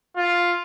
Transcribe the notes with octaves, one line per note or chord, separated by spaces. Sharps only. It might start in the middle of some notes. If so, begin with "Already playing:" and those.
F4